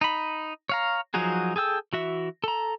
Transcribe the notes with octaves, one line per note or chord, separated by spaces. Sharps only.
D#4 B5
C#5 F5 A#5
F3 F#3 D#4 F#4 G#4
G#4 A4 G5 E6
E3 F#4 E5
A4 A#5